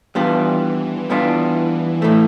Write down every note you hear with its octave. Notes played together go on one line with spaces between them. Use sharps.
E3 G3 B3 D4 F4
G3 B3 D4 F4
A2 E3 A3